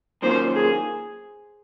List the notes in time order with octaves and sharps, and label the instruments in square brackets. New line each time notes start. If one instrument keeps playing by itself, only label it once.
[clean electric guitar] F#2 D#3 A#3 C#4 F4 [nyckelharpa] C5
[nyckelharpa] G#4